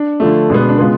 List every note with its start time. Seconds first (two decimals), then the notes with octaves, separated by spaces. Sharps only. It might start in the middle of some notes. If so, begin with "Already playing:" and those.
Already playing: D4
0.20 D3 F3 A3
0.50 B2 G#3 B3 D4
0.69 D4
0.78 C#3 G#3 B3 F4